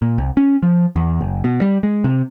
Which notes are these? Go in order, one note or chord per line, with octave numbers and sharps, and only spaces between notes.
A#2
C2
C#4
F3
E2
F#1
B2
G3
G#3
C3